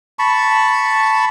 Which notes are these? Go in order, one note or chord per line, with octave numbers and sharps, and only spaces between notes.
A5 B5 C#6